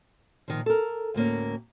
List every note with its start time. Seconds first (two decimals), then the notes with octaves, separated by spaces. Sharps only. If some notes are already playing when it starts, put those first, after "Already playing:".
0.48 A#2 D#3 F3
0.66 A4 A#4
1.14 D2 A2 A#3 C#4